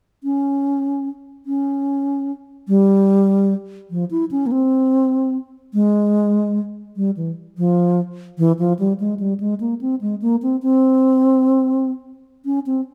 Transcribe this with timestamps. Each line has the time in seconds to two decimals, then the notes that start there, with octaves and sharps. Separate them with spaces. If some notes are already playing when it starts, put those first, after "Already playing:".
0.24 C#4
1.46 C#4
2.68 G3
3.91 F3
4.11 E4
4.31 C#4
4.46 A#3
4.52 C4
5.74 G#3
6.96 G3
7.17 E3
7.58 F3
8.38 E3
8.59 F3
8.79 G3
9.00 G#3
9.19 G3
9.40 G#3
9.60 A#3
9.81 C4
10.01 G#3
10.22 A#3
10.42 C4
10.62 C4
12.45 C#4
12.66 C4